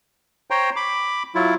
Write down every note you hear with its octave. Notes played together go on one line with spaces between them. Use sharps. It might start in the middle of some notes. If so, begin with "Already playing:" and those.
C5 C#5 G5 A#5 C6
B5 D6
F#3 E4 F4